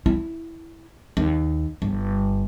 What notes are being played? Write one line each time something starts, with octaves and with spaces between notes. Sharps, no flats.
E4
D#2
G1